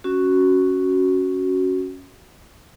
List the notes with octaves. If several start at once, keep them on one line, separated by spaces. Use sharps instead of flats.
C#4 F#4